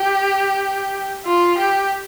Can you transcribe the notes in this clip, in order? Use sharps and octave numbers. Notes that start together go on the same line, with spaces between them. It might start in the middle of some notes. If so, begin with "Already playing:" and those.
Already playing: G4
F4
G4